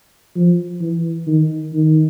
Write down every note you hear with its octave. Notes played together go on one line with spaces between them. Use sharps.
F3
E3
D#3
D#3